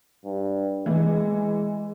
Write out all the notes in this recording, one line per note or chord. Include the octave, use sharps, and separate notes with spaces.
G2
E3 G#3